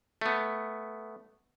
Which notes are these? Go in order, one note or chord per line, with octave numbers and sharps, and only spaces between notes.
A3 B3